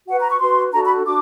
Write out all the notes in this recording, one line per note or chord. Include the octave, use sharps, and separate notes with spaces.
F#4 B4 F#5
A#5
C#6
F#4 B4 C6
D4 F#4 A4 A#5
B5
D4 F#4 D6